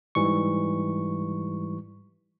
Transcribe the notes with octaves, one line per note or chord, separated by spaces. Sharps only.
G#2 E3 G3 C#6